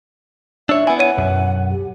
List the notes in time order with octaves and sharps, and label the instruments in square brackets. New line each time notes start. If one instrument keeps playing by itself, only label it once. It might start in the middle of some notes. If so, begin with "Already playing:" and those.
[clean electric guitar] D4 C#5 [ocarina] E5 [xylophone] E6
[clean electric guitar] B3 E4 [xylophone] G#5
[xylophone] C#5 D#7 [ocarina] F#5
[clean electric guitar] B1 F#2
[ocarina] G4